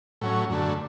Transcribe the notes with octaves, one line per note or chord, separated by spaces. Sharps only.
A2 F#3 C#4
F#2 D3 A3